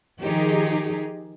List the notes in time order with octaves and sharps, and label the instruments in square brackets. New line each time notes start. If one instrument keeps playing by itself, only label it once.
[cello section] D#3 F3 D#4 G4 G#4